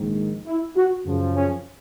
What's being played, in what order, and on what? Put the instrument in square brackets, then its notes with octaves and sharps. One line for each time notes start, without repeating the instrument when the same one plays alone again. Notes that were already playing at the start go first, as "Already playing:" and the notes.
Already playing: [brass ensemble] A#1 G#2 D#3
E4
F#4
F#2 C#3 F3
C#4